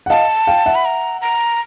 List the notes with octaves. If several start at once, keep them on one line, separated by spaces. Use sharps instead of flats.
F#5
D#5 F5 A5
F5 G5
E5 F#5
B5
A#5
A#5